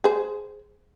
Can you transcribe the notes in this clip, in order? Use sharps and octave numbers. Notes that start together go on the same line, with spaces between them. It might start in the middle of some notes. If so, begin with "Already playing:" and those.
G#4 C5